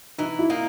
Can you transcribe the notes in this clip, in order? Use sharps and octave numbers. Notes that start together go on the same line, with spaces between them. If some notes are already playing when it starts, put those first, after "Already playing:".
E3 D#4
E4
A#3 D#4